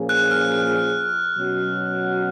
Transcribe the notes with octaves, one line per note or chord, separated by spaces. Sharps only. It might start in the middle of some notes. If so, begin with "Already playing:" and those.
Already playing: A#2 F3 A#3 C#4 G#4
F#6
F6
F#6
B2 F#3 C#4 F#4